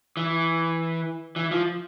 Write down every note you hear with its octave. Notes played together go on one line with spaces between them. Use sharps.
E3
E3
F3